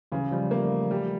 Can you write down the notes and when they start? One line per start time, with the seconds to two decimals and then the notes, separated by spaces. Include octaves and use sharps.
0.12 C#3 E3 F#3
0.31 F3 G3
0.51 G3 A3 A#3
0.91 G3